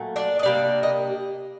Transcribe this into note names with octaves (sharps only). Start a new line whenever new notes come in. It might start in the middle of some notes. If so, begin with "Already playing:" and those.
Already playing: A#2 F#3 A3
D4 D5
D#5
C3 G3 A#3 D4 D5
D#5